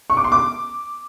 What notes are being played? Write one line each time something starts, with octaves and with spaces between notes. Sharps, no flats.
C#6
D6
C6
D6